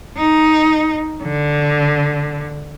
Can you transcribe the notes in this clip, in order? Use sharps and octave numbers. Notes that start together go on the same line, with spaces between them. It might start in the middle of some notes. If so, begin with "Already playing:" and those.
D#4
D3